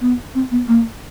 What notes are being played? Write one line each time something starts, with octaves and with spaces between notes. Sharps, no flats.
B3
C4
B3
A#3